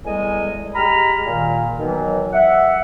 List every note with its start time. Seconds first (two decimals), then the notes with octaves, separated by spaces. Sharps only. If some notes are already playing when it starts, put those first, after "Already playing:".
0.03 E2 A2 G3 G#3 D#5 G#5
0.75 G#3 G4 A#5 B5 F6
1.26 A#2 D#3
1.79 B2 D#3 E3 F#3
2.33 E5 F#5